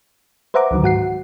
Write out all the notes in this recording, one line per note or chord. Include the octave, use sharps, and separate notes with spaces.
B4 C5 E5 F#5 A#5 D6
C#2 D3 D#3 F#3
G#2 F#4 F#5 C7